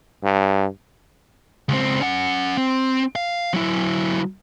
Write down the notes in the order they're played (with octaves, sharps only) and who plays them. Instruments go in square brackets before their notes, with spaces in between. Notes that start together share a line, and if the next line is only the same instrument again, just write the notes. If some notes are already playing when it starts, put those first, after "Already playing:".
[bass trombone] G2
[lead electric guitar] C#2 C4
C#4 F#5
C4
F5
F#3 E4